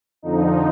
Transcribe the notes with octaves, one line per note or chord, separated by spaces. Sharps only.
F2 D3 F3 D#4